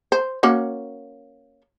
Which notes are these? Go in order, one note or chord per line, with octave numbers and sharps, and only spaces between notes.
C5
A#3 C#4 F#4